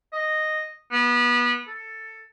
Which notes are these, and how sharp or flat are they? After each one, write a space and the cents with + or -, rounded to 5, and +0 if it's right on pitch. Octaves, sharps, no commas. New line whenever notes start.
D#5 -5
B3 -25
A4 +10